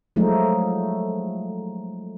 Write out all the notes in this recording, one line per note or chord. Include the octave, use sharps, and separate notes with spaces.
F3 F#3 G#3 A3 D#4